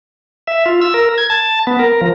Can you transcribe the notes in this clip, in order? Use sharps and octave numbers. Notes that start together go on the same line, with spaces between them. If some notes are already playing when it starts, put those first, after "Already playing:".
E5
F4
E6
A#4
G#6
A5
B3
A#4
F3